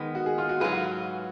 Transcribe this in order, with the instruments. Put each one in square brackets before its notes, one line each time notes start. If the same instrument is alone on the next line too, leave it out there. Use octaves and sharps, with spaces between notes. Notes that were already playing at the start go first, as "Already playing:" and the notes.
Already playing: [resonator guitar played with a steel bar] D#3 G#3 B3
[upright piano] F#4
G#4
F4
F#4
[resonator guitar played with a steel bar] G#2 F#3 C#4 F4 B4 [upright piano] G#4
[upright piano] F#4